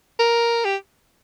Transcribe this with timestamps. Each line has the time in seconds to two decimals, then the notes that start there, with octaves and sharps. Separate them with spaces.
0.19 A#4
0.65 G4